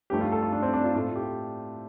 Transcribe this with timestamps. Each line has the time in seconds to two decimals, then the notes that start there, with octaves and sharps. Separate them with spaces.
0.10 G2 F3 A3 G4
0.20 F4
0.32 A4
0.42 F4
0.52 D4
0.63 C4
0.73 D4
0.84 F4
0.94 A2 A3 F4
1.15 G4